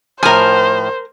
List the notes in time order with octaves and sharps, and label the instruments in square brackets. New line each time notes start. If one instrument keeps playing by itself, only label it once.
[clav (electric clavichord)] A2 F3 [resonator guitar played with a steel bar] A#4 G#5 [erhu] C5